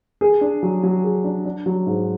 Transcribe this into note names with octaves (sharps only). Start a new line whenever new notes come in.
G#4
D4
F#3
F#3
G#4
D4
D4
F#3
G#2